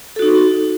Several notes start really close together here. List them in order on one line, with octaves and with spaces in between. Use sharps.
A4 F#4 D#4